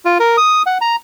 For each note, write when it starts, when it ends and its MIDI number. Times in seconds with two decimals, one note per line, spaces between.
0.05 0.18 65
0.20 0.36 70
0.37 0.62 87
0.66 0.78 78
0.81 0.96 82